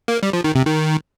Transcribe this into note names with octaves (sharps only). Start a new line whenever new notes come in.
A#3
G3
F3
D#3
C3
D#3